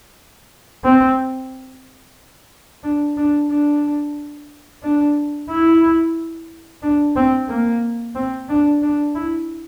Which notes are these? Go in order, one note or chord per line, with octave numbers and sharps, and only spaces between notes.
C4
D4
D4
D4
D4
E4
D4
C4
A#3
C4
D4
D4
E4